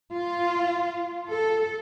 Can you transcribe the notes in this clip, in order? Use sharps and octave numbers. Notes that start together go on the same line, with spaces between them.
F4
A4